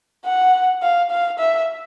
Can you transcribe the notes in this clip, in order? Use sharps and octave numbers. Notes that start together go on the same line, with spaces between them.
F#5
F5
F5
E5